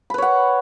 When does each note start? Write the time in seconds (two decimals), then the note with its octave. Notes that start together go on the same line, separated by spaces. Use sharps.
0.10 B5
0.14 B4
0.18 C#5
0.22 F#5